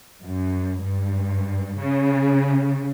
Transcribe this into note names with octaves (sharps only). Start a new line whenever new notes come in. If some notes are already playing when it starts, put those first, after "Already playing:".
F#2
G2
C#3